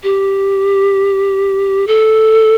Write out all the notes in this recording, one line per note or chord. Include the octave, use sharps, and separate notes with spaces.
G4
A4